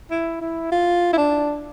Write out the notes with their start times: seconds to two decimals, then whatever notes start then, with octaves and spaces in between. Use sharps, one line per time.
0.11 E4
0.41 E4
0.72 F4
1.13 E4
1.18 D4